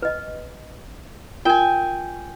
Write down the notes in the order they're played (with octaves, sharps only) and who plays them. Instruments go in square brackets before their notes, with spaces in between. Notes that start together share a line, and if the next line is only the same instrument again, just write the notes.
[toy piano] B4 D#5
[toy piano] F4 A#4 [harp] G5 G#5